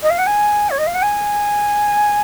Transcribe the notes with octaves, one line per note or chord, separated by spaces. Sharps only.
D#5
F5
F#5
G#5
C#5
D#5
F5
F#5
G#5